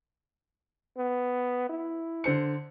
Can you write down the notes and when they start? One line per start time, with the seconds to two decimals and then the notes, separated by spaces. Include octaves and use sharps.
0.97 B3
1.69 E4
2.24 D3 C5 C#7